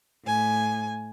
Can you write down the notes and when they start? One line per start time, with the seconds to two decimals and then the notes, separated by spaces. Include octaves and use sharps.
0.24 A2 G#5